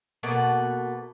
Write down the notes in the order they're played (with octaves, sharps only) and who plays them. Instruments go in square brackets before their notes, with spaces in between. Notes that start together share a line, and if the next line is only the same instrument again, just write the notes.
[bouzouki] B2 A3 A#3 F#5